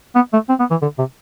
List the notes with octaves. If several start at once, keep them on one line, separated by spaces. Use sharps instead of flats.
B3
A3
C4
B3
E3
D3
C3